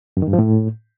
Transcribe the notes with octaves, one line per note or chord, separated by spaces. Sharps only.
F#2
D#3
G2
F3
A2